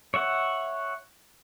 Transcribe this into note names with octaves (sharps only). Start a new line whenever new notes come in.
C#5 E5 F#5